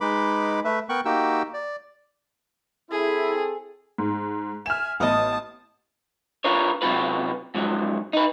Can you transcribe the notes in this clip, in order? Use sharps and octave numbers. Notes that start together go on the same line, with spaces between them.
G#3 D#4 B4 B5 D6
A3 B4 E5
B3 A#4 G5 C#6 F#6
A#3 D#4 F#4 G4 G5 E6
D5
C4 E4 G#4 A4 G#5
G#2
E5 G#5 F6 E7
A1 B3 D#5 A5 D#6
D4 F4 A#4 B4 C#5
C3 F#3 B3 F4 B4
G#2 F3 F#3
D#4 B4